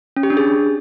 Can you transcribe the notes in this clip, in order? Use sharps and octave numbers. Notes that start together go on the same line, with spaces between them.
C#4
G4
D4
G#4